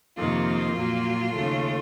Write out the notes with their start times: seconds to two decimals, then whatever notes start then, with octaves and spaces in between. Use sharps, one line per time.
0.17 F2 C3 D#3 A#3 F4
0.74 A#2 F#3 A#3
1.33 D#2 C#3 A3